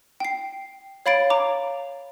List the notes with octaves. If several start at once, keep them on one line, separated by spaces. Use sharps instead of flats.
G5 C7
C#5 F5 B5 A6 D7
A#5 D6